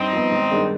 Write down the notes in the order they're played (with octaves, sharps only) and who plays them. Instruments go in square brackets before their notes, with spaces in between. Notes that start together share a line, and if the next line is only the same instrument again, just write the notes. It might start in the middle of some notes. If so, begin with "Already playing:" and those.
Already playing: [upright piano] G2 [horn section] C4 D#4
[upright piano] F3 B3
G#1
G2 D#3 G#3 D4